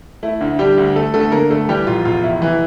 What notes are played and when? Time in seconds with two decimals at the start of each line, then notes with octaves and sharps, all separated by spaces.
0.23 A3 E4
0.41 D2
0.59 D3 G3 G4
0.78 D2
0.96 A3 A4
1.14 D2 A3 A4
1.32 D3 A#3 A#4
1.50 D2 A3 A4
1.69 E3 G3 G4
1.87 F1 F4
2.05 E2 F4
2.23 F1 E4
2.42 E3